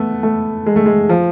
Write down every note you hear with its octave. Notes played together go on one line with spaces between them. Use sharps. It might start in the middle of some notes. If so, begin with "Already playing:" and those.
Already playing: A3 B3
A3
G#3
A3
G#3
F3